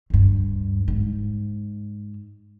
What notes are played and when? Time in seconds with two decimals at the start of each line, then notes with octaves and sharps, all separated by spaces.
0.10 D2 G2
0.88 G#2